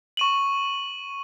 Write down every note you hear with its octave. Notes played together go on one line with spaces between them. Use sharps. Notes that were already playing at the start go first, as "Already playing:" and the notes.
C#6 D#7 F#7